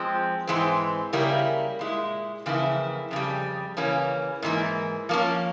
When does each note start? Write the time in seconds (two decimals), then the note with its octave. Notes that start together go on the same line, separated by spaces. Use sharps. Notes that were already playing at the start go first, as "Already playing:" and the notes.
Already playing: F3 G#3 C4
0.47 G#2 E3 G#3 C4
1.13 C#3 G3 A#3 E4 A#4
1.79 A#2 G#3 E4
2.46 F2 C#3 E3 A#3 E4
3.11 F2 C#3 G3
3.77 C#3 E3 A#3 C#4
4.42 G#2 E3 A#3
5.09 F3 A#3 C#4